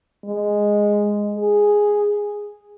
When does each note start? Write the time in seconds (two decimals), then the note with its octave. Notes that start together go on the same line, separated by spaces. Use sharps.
0.25 G#3
1.34 G#4